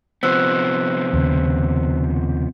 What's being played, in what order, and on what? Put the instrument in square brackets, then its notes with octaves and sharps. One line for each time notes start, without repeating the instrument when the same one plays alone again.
[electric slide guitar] C3 F3 B3 [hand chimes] C5 E6 F#6
[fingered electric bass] D#2 C#3